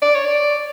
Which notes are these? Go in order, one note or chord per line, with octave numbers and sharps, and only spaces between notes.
D5
C#5
D5